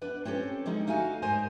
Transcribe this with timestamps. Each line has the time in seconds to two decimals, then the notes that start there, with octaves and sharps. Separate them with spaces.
0.02 B3 D4 B4
0.25 C4 C#4 G4 A4
0.66 D3 G3 G#3 D#4
0.87 A3 D#4 F#4 F5 G#5
1.22 G#2 G3 A#4 C5 D#5 G#5